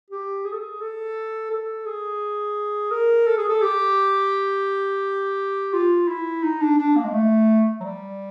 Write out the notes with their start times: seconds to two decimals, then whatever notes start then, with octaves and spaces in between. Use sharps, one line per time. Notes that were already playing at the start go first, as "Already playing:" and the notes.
0.10 G4
0.45 G#4
0.53 A4
0.60 G#4
0.81 A4
1.51 A4
1.86 G#4
2.91 A#4
3.27 A4
3.38 G#4
3.49 A4
3.62 G4
5.73 F4
6.08 E4
6.43 D#4
6.61 D4
6.78 D4
6.96 A#3
7.05 G#3
7.13 A3
7.80 F#3
7.84 G3